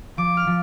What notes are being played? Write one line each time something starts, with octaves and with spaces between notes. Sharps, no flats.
F3 D6
F6
F3